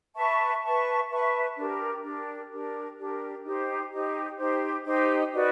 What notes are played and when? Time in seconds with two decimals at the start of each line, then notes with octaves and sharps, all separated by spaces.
0.16 B4 E5 A5 C#6
0.63 B4 E5 A5 C#6
1.10 B4 E5 A5 C#6
1.57 D4 G4 A#4
2.02 D4 G4 A#4
2.51 D4 G4 A#4
2.96 D4 G4 A#4
3.44 D#4 G4 C5
3.91 D#4 G4 C5
4.38 D#4 G4 C5
4.85 D#4 G4 C5
5.32 D#4 F#4 B4 D5